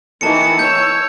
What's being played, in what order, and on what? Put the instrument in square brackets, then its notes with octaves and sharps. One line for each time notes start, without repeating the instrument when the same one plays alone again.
[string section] D#3 E3 [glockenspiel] A5 C#7
[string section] C#5 E6 [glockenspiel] G6